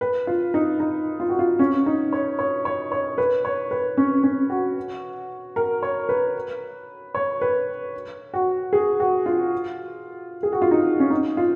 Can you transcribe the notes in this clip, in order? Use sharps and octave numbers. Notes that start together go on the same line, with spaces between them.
B4
F4
D#4
D#4
F4
F#4
F4
C#4
D#4
C#5
C#5
C#5
C#5
B4
C#5
B4
C#4
C#4
F#4
A#4
C#5
B4
C#5
B4
F#4
G#4
F#4
F4
G#4
F#4
F4
D#4
C#4
D#4
F4